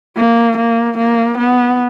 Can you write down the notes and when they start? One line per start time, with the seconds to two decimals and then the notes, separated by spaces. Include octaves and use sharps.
0.17 A#3
0.57 A#3
0.98 A#3
1.38 B3